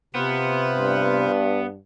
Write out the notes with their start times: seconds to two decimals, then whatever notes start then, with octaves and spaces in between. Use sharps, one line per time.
0.15 C3 B3 F4 B4 C5
0.76 G2